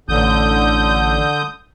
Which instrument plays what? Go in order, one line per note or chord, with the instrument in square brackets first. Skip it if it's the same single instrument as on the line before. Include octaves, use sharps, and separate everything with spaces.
[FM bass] A1 [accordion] D3 D#6 G6